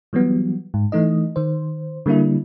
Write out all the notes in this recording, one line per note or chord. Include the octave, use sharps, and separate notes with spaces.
E3 F#3 G3 B3
G#2
E3 A3 D#4 D#5
D#3 C5
D3 G3 A#3 D4 E4